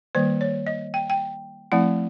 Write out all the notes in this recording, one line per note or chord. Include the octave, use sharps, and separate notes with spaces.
D#3 G3 A#3 C5
C#5
D#5
G5
G5
F3 A3 C4 E4 F#5